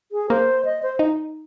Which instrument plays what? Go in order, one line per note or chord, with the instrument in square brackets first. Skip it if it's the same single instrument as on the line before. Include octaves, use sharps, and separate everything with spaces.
[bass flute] G#4
[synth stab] A#3 [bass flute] C5
[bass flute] D#5
C5
[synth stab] D#4